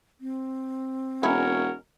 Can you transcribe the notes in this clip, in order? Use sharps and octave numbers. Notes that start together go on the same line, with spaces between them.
C4
E1 G#3 C#4 E4 F#4 A#4 C#5